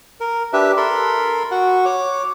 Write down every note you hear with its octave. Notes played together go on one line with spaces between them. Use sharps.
A#4
D4 G4 B4 E5
A4 A#4 B5 C6
F#4 F#5 C#6
C#5 D6